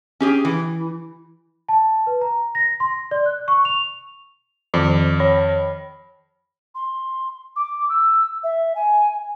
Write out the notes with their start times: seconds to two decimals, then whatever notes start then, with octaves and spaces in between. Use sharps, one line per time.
0.20 C#4 G4 G#4
0.45 E3
1.69 A5
2.07 B4
2.21 A#5
2.55 A#6
2.80 C6
3.11 D5
3.26 F#6
3.48 C#6
3.65 F7
4.74 F2 D#3 F3
5.20 C#5 B5
6.75 C6
7.56 D6
7.89 E6
8.44 E5
8.75 G#5